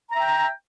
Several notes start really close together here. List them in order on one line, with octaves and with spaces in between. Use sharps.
A#5 E5 G5